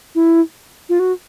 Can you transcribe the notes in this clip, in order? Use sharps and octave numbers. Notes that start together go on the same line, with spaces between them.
E4
F4
F#4